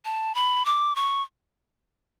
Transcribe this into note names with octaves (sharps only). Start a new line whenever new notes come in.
A5
B5
D6
C#6